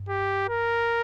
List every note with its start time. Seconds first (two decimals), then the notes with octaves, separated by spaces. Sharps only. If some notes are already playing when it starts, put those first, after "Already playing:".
Already playing: G2
0.09 G4
0.49 A#4